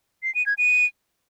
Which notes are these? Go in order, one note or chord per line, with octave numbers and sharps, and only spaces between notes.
C7
D#7
G#6
D#7